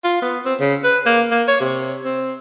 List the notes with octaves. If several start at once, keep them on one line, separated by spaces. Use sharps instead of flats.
F4
B3
C4
C#3
B4
A#3
A#3
C#5
C3
C4